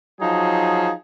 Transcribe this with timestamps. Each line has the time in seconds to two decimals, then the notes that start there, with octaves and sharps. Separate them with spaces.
0.20 F3 F#3 D#4 G#4